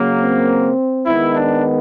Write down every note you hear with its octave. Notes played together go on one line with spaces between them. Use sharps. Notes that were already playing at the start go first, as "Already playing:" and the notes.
Already playing: C#3 F#3 A#3
C4
D#3 G#3 B3 E4
D4